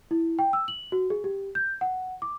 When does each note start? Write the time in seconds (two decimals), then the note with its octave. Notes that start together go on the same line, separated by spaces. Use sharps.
0.11 E4
0.39 G5
0.53 E6
0.68 F#7
0.92 F#4
1.10 G#4
1.24 G4
1.55 G6
1.81 F#5
2.22 D6